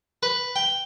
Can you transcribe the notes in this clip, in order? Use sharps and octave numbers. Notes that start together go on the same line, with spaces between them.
B4
G5